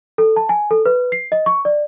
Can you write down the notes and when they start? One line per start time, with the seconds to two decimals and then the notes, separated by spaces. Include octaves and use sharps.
0.18 A4
0.36 A5
0.49 G#5
0.71 A4
0.86 B4
1.12 C7
1.32 D#5
1.46 C#6
1.65 D5